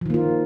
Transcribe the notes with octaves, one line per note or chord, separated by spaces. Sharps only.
D#3 F3 A#3 F4